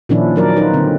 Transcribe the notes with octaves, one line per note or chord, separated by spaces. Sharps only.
A#2 D#3 F3 C#4 D4 E4
F#3 A#4 D5
D#4 F4 B4
D3 C4